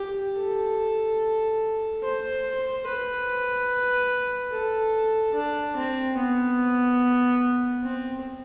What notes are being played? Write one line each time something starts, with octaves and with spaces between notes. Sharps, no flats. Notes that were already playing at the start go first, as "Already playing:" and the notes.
Already playing: G4
A4
C5
B4
A4
D4
C4
B3
C4